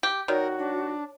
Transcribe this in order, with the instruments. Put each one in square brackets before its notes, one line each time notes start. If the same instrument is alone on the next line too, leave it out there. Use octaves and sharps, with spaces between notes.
[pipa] G4
[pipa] D#3 [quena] F#4 [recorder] A#4 [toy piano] C#5 D5
[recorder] D4